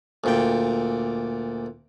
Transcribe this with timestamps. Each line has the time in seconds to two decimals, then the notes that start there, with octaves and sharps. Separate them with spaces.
0.24 D2 A#2 G5